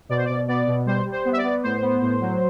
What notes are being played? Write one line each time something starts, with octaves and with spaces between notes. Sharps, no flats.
B2 D5
C5
B2 D5
B3 D5
B2
G3 C5
G3
C5
B3
E5
D5
B3
A2 C5
B3
A2
F#3